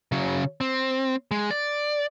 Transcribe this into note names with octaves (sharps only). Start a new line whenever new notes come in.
C#3 F#3
C4
G#3
D5